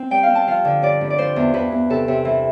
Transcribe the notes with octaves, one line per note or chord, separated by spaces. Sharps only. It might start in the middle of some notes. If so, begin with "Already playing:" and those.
Already playing: C4
G3 G5
F5
C4
A5
F3 F5
D3
G2 D5
G2
D5
F3 C5
E2
E2 B4
E2
C3 A4
C3
E3